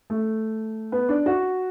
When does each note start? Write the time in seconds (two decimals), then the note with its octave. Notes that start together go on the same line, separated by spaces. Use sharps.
0.10 A3
0.92 B3
1.09 D4
1.26 F#4